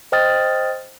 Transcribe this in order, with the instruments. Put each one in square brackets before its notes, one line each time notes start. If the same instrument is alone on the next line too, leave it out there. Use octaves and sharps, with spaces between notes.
[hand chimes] C5 D#5 G5 D#6 F6 A6